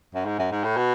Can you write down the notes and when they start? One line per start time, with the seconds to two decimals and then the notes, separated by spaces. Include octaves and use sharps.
0.15 F#2
0.26 G#2
0.39 F#2
0.51 G#2
0.64 A2
0.77 B2